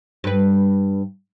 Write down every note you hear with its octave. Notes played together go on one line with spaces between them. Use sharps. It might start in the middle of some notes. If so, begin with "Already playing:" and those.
G2 B4